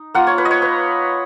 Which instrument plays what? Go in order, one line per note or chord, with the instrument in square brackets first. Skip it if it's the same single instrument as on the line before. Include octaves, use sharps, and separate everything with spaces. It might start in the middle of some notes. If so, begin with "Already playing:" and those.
Already playing: [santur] D#4
A#3 F4 F#5
C#5
B4
D#5
C#5
B4